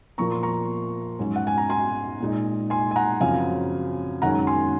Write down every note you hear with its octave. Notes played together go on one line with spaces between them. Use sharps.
A#2 F3 A#3 A#5 C#6
C6
A#5 C#6
G#2 F#3 C#4
F#5
G#5
A#5
G#5 C6
A#2 G#3 D#4
G#5 C6
G#5
F#5 A#5
F#2 C#3 F3 C4 F5 G#5
F#2 D#3 G#3 C#4 F#5 A#5
G#5 C6